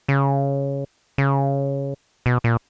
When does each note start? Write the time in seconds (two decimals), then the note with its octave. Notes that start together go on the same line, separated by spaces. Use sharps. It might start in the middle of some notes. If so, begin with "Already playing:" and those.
0.08 C#3
1.18 C#3
2.26 B2
2.44 A#2